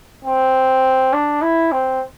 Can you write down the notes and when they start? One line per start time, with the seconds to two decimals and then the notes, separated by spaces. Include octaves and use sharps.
0.25 C4
1.13 D4
1.42 E4
1.72 C4